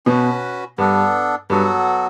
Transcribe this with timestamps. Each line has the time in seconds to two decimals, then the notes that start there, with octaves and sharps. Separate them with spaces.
0.06 B2 C#4 F#4 B4
0.78 G2 B3 D4 A4
1.50 G2 F#3 B3 F#4 A4